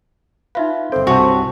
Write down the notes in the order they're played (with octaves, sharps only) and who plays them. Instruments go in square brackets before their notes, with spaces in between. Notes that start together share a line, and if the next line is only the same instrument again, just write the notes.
[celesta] D#4 E5 F5 [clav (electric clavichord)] F4 B4
[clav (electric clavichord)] G1 G5 [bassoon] C4 [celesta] A4
[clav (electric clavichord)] C2 G2 C3 [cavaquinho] F#4 C#5 [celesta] G#5 A5